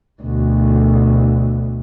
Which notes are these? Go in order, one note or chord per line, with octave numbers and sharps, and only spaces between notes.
D2 B2